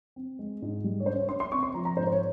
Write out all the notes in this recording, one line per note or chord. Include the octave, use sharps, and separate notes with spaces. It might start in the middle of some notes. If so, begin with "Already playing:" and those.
C4
G#3
G#2
G3
C#5
C#4 C5
C#5
C#4 C6
C6
C4 C#6
C6
F3 A#5
A#5
G#2 C5
C5
C#5